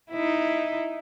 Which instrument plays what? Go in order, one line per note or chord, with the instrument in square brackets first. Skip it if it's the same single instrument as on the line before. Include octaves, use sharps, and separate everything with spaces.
[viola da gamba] D#4 E4